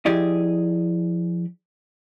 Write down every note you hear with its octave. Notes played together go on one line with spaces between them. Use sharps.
F3 E4 G4 G#4 D5 D#5